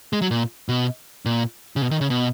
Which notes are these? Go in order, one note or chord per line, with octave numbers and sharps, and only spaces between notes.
G#3
F#3
A#2
B2
A#2
C#3
B2
D#3
C#3
B2